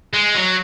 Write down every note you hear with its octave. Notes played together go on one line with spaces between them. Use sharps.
G#3
F#3